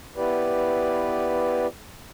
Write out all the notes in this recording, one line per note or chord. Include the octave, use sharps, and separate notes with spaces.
B3 E4 G4 B4 D5